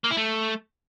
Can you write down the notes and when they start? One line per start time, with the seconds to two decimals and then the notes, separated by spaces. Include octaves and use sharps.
0.04 A#3
0.10 E4
0.17 A3